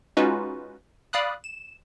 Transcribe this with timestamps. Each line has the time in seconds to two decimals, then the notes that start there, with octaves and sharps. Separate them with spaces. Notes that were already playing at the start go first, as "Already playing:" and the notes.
0.17 G#3 C#4 D#4 F4 F#4 B4
1.13 D5 F5 B5 D#6 F#6
1.44 E7